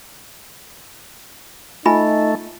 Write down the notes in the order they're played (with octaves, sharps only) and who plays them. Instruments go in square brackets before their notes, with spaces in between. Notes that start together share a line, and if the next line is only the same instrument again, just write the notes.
[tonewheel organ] A3 [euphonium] D#4 [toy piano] F4 G#5 B5